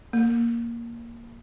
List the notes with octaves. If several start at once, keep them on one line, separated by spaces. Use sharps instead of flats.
A#3